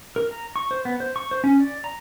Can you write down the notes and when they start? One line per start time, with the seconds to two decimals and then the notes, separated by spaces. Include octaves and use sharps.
0.16 A#4
0.31 A#5
0.56 C#6
0.71 C5
0.85 B3
1.00 C5
1.16 C#6
1.31 C5
1.44 C#4
1.60 D5
1.84 A#5